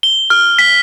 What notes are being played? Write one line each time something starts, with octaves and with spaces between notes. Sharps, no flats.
G7
F6
B6